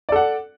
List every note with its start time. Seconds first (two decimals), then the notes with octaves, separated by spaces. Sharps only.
0.09 D5
0.12 A4
0.16 F#5